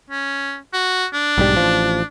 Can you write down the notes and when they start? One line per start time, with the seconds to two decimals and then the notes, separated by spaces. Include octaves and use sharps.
0.10 C#4
0.74 F#4
1.13 D4
1.38 B1 G#2 G3
1.57 A1 F3